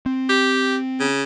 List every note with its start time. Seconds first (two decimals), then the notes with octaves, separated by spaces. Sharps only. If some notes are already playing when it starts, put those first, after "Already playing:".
0.06 C4
0.29 G4
1.00 C#3